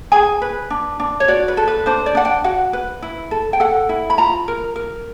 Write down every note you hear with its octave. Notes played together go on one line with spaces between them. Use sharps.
G#4 G#5
B4
D4
D4
C#5
F#4 D5
B4
A4
B4
D4 C5
D5
D4 F#5
G5
F#4 F#5
B4
E4
A4
G5
A4 F#5
E4
B5
F4 A#5
A#4
A#4